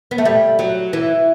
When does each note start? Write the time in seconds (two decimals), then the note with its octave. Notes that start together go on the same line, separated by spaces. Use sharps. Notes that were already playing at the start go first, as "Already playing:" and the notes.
0.11 B3
0.18 A3
0.25 G3
0.59 F#3
0.93 E3